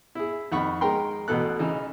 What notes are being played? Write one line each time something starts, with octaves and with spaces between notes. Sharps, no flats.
E4 G#4
F2 D#3 F#5 B5 C#6
G#3 A#4 G5 C6
A1 B2 A4 F#6
C#3 E3 D#4